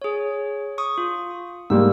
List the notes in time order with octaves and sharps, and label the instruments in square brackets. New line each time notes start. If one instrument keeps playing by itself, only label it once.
[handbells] G#4 C#5
C#6 D#6
F4
[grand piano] G#2 G3 A#3 [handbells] E6